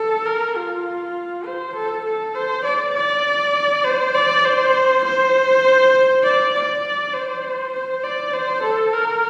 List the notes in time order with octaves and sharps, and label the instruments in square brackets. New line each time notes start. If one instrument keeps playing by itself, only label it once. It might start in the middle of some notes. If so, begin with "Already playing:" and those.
Already playing: [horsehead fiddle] A4
A#4
F4
C5
A4
A4
C5
D5
D5
C5
D5
C5
C5
D5
D5
C5
C5
D5
C5
A4
A#4